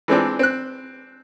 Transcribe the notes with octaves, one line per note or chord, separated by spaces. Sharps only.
E3 G#3 C4 D4
C4 F#6